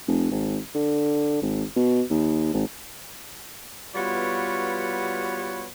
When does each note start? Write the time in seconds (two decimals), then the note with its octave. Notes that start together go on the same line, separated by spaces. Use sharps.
0.07 F1
0.31 G#1
0.75 D3
1.42 G#1
1.76 B2
2.10 D#2
2.53 G#1
3.96 G3 B3 F4 F#4 B4 C#5